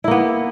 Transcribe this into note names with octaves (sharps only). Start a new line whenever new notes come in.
A#3 B3 E4